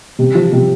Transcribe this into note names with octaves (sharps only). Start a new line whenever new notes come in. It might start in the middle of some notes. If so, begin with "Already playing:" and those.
C3
F3
C3